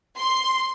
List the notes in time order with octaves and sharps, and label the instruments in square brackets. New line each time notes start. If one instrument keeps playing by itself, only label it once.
[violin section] C6